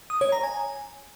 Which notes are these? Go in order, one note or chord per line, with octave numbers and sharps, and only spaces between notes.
D#6
C#5
A#5
G#5